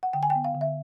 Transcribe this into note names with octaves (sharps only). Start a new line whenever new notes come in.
F#5
D3 G5
G#5
G5
B3
F5
D3
E5